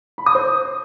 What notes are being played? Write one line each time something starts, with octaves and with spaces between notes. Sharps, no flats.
B5
D#6
C5